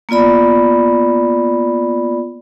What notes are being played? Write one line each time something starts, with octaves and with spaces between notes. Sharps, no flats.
A#3 B3 F4 D5 B5